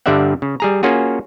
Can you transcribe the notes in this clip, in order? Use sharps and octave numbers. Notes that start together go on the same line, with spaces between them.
G2 D3 G3 D5 E5 F#5
C#3
G3 G#4 A#5
A#3 C#4 F4 F#4 G#4